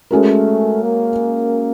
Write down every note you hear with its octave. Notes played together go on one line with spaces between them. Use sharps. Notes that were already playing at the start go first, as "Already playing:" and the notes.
G#3 A3 C#4 F#4 A#4
A#3